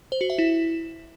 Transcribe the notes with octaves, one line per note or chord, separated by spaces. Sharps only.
C5
F#4
E5
E4